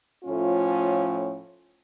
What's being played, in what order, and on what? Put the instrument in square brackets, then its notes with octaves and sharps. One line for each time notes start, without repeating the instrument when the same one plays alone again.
[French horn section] A2 F3 A3 C#4 F4